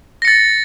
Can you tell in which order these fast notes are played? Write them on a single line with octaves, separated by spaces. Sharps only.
A#6 C#7 A6